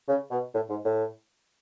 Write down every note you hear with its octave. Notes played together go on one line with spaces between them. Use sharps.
C#3
B2
A2
G#2
A2